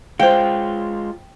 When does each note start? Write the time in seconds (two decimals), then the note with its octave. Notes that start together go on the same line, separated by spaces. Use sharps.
0.20 G#3 F4 C5 F5 G5